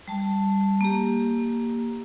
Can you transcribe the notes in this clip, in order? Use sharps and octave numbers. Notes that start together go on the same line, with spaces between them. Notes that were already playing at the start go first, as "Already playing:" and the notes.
G3 A5
A#3 G4